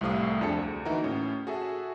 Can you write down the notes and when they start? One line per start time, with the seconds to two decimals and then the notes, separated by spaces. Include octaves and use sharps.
0.01 C2 A2 C3 A3 F5 D#6
0.41 F2 D4 G#4 A4 C#7
0.57 D2
0.85 E3 A#3 D#4 E4 F#4 A#4
1.04 A2 C#4
1.47 F#4 G#4 A4 E5